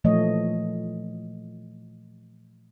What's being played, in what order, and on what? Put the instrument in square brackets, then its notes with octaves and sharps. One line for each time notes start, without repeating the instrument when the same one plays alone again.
[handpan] A#2 E3 F3 A3 C#5 D#5